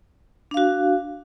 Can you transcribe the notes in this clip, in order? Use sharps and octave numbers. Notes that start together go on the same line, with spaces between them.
D4 F#4 F5